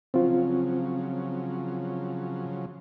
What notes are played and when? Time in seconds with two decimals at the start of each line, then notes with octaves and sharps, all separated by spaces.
0.14 C#3 F3 F#3 C4 F4